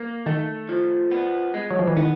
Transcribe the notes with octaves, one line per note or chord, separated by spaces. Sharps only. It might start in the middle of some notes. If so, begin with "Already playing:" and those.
Already playing: A#3
D#3 A3
F3
B3
G#3
F#3
F3
E3
D#3 B3